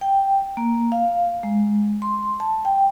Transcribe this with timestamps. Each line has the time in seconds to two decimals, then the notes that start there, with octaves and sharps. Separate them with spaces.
0.01 G5
0.57 A#3
0.92 F5
1.43 G#3
2.02 C6
2.40 A5
2.65 G5